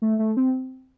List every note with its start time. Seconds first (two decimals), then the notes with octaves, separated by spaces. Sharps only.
0.02 A3
0.19 A3
0.37 C4